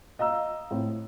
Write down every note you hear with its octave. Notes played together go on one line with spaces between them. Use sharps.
D#5 F5 A#5 E6
A2 C4